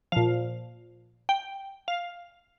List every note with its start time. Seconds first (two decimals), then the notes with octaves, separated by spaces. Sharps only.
0.12 A#2 F3 F5
1.29 G5
1.88 F5